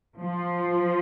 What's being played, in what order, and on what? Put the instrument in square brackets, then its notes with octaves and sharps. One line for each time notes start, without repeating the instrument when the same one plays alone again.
[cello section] F3